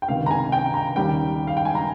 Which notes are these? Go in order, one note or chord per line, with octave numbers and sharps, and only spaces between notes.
G5
C#2 C3 D#3 F5
A#5
G#5
G5
A#5
D#2 C#3 G3 G5
F5
G5
G#5
A#5